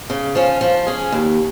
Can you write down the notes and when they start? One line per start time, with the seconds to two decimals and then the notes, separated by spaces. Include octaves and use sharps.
0.10 C#3
0.35 F3 C#4
0.61 F3
0.87 C#4 G#4
1.12 D#2